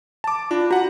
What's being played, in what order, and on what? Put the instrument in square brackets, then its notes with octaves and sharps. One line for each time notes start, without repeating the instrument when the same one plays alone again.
[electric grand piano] A5 D6
[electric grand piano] D4 [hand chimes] F4
[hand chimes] F#4 [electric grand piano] F#5 A#5